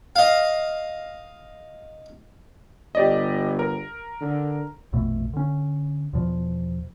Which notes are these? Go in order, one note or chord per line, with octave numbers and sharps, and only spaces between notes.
D#5 F5
G1 G4 D5 D#5
A#4
D3
A#1 F2 B2 A3
D3 C#4
E2 B2 F3